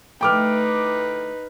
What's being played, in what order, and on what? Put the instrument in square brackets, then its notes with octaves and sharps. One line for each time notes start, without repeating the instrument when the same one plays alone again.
[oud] D2 A3 E4 [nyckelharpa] D#4 B4 [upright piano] G5 D6 F6